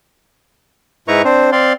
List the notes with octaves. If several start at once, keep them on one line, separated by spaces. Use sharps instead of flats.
G#2 D#4 E4 B4 A#5 C#6
C4 D4 C5
C4 D5 F5 C6